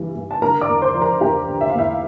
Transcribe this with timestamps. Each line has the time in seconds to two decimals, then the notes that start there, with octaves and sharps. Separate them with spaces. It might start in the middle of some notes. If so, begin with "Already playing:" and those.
Already playing: G2 E3
0.15 G2
0.31 A5
0.42 D3 A#4 A#5
0.61 D5 D6
0.68 E2
0.82 C5 C6
0.94 F3
1.01 A#4 A#5
1.21 E2 G4 G5
1.47 D3
1.61 E5
1.70 F5
1.74 E2 E4 E5